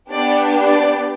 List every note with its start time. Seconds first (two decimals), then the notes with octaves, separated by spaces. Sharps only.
0.11 B3 D4 G4 D5
0.67 D5